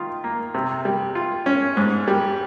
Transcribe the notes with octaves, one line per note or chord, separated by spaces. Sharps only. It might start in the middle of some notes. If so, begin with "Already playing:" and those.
Already playing: D#3 F4
A#3
C3
G3
F4
C#4
G#2
G3